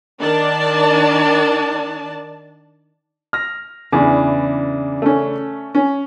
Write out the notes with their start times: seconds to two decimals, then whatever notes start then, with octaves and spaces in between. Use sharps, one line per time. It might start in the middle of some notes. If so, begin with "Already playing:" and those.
0.19 D#3 D4 D5 A5
3.33 F6 A#6
3.92 E2 C#3 E3 D4
5.02 A3 C#4
5.75 C#4